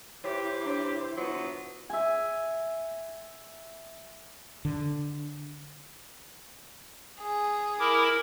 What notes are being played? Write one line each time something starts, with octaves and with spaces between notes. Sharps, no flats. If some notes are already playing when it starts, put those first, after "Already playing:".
E3 E4 G4 C5 C#5
D4 C#5
D3 F#3 B3 F4
E5 G#5
D3
G#4
E4 A#4 D6